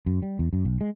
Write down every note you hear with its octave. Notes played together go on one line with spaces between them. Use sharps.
F#2
G3
E2
F#2
B1
G#3